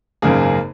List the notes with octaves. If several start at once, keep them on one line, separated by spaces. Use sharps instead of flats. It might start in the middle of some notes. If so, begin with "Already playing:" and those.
G#1 F#2 C#3 A#3 G#4